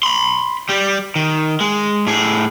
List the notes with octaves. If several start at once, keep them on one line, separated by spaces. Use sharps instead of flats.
B5 C6
G3 G4
D#3
G#3
A2 G#4